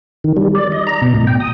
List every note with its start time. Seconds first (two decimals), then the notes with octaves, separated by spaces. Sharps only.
0.24 D#3
0.37 G3
0.55 D5
0.72 D#5
0.87 A#5
1.02 B2
1.15 A2
1.27 G5
1.40 D#6